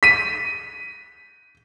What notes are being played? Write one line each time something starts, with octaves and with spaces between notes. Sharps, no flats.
B6 D#7